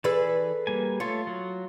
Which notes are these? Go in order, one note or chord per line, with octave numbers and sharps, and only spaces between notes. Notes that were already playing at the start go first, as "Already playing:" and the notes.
E3 G#4 A4 B4 D5 E6
G3 A#3 G#5
A3 F4 A4 C#5
F#3